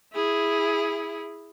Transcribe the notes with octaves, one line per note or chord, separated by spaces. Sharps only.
E4 G#4